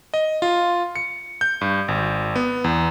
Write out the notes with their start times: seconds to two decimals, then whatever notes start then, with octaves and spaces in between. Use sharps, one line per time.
0.14 D#5
0.42 F4
0.95 C#7
1.41 G6
1.61 G2
1.88 G#1
2.36 B3
2.64 E2